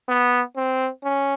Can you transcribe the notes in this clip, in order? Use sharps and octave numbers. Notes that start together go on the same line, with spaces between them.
B3
C4
C#4